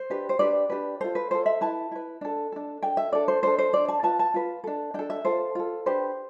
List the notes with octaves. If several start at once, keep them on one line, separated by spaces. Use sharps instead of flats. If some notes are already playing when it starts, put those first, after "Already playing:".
Already playing: C5
D4 G4 B4
C5
D4 G4 B4 D5
D4 G4 B4
F4 A4 C5
B4
F4 A4 C5
E5
E4 B4 A5
E4 B4
D4 A4
D4 A4
D4 A4 G5
E5
D4 A4 D5
C5
D4 A4 C5
C5
D4 A4 D5
A5
F4 B4 A5
A5
F4 B4
D4 A4
D4 A4 G5
E5
F4 A4 C5
F4 A4
D4 G4 B4 C5